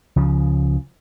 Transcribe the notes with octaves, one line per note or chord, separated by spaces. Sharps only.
C#2 C#3 F3